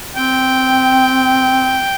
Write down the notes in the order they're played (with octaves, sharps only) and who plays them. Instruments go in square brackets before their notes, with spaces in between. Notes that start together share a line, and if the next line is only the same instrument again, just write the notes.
[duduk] C4 [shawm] G5